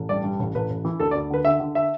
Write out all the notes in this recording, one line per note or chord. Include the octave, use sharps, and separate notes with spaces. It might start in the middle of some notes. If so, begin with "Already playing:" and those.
Already playing: A1
G2 D5
G2
A1
A1 B4
A1
E3
D2 A4
D5
D2
D3 B4
D3 E5
D3
E5